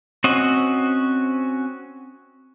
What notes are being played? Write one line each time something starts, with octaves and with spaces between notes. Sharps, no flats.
C4 C#4 F#4 D#5